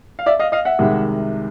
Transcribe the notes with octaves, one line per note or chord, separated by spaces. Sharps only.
F5
D5 E5
D#5 F5
D#5 F5
E5 F#5
C2 C3 D#3 G#3